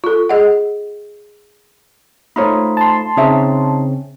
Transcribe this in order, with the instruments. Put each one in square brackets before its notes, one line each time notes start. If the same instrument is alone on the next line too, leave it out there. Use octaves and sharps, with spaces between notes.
[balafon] F4 A4
G#4 D#5 F#5
[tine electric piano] A3 C5 B5 [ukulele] D#4 F4 C#5
[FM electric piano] A5 C6
[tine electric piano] C#3 C4 C#4 [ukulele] D#4 C#5 E5